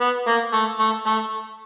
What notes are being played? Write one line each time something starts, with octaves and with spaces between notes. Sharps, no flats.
B3
A#3
A3
A3
A3